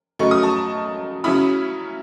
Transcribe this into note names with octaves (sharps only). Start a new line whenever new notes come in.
C#3 F#3 A3 D#4 C#6
D#6
A5 C#6
C#3 F#3 C#4 E4 B5 D#6